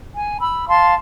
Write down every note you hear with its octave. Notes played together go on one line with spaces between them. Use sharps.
G#5
B5 E6
F5 A5 C6